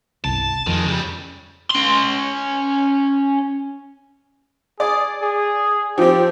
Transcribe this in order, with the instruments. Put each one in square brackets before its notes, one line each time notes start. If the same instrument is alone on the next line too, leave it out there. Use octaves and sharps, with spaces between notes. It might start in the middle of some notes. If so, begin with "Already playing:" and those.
[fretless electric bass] G1 C2 [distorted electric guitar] A5
[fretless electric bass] F2 [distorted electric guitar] D#3 G#3
[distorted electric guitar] C#3 G3
[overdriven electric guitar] C#4 C6
[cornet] G#4 [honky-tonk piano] D5
[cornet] G#4
[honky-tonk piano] F3 C4 [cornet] G4